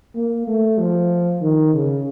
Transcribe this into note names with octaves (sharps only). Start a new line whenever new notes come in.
A#3
A3
F3
D#3
C#3